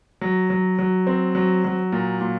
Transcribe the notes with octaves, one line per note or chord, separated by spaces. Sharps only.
F#3
F#3
F#3
C4
F#3
F#3
A#2
A#2